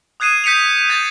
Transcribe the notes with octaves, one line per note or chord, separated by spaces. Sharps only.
D#6 F#6 G#6 C7 D#7 E7
G6 B6 C#7 D#7 F7
G6 A6